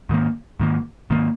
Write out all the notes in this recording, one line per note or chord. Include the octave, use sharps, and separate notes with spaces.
G#2 D#3 A#3
G#2 D#3 A#3
G#2 D#3 A#3